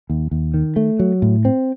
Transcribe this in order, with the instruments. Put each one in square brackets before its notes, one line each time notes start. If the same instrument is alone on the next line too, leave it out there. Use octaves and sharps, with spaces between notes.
[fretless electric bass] D#2
D#2
D#3
A3
F#3
A2
C4